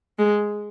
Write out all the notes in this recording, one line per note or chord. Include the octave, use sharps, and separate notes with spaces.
G#3